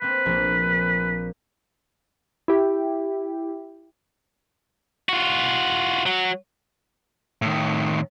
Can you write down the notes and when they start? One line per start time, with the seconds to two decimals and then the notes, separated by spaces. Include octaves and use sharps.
0.02 A#3 C4 B4
0.26 A#1 A#3
2.48 E4 G4
5.09 F4 F#4
6.06 F#3 F#4
7.42 A2 D#3